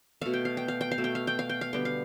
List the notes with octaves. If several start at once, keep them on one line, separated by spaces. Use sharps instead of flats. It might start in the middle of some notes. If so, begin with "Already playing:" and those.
B2 A3 F5
G5
F5
G5
F5
G5
F5
B2 A3
G5
F5
G5
F5
G5
F5
D3 G3 B3 G5
F5